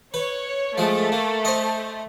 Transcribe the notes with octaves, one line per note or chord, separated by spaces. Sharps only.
B4 C#5
F3 G#3 A3
A#3
C5 D#5